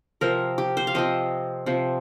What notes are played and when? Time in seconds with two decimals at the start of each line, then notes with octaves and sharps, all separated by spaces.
0.21 C3 F3 C4 A#4
0.58 G4
0.77 C5
0.87 F5
0.94 C3 F3 C4 D#5
1.66 C3 F3 C4